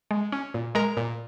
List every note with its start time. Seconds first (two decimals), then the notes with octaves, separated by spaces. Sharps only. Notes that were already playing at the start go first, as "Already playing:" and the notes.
0.11 G#3
0.32 C#4
0.54 A#2
0.75 G#3 A#4 A#5
0.97 A#2